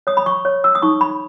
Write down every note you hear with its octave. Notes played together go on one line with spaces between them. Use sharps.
C#5 D#6
B5
C#6
C#5
E6
D#6
D#4 C#6
B5